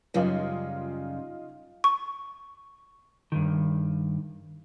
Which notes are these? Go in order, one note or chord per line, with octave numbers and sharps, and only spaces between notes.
F#2 C#3 G3 D#4 F4 D#5
C#6
G2 D#3